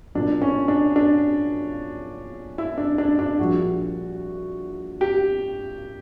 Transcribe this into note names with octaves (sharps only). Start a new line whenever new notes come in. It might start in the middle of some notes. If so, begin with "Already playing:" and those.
B1 A#2 F#3 D4
C#4
D4
D4
E4
D4
D4
D4
A#1 A#2 G3 F#4
G4